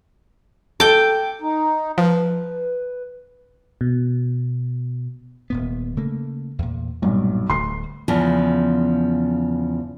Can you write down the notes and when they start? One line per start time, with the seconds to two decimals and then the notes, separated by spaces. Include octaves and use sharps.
0.80 A4 G5 D6
1.41 D#4
1.98 F3 B4
3.81 B2
5.50 D#1 A#2 B3
5.97 C#3 A3 A#3
6.59 E2 A#2
7.02 B1 G2 A#2
7.50 D1 D3 A3 C6 C7
8.08 E2 C#3 F3